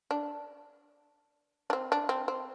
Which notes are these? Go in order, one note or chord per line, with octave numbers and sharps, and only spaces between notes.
D4
D4
C4
D4
C4
C4